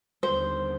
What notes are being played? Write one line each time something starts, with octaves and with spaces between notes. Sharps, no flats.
D#2 D3 G3 B3 C5